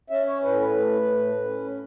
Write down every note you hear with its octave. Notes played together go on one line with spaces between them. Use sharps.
C#4 E5
C#5
A2 B4
B4
A3
A2
C#4